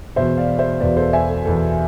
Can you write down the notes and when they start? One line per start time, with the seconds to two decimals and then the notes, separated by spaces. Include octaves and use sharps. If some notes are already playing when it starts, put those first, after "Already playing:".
0.16 E1 E2 B2 C5 E5
0.37 D5 F5
0.59 C5 E5
0.80 E1 E2 B2 B4 D5
0.97 A4 C5
1.13 E5 G#5
1.29 A4
1.45 E1 E2 B2 A4